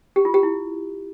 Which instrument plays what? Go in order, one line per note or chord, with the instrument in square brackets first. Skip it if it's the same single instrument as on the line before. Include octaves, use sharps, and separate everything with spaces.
[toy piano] G4
F4
G4
E4